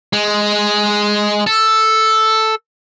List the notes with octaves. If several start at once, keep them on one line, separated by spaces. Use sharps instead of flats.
G#3
A4